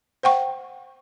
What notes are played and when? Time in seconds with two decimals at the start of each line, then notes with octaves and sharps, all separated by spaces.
0.23 C5 F#5 G5 C#6